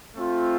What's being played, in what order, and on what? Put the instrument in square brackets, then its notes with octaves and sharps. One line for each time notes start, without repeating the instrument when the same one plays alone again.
[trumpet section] A3 C4 F4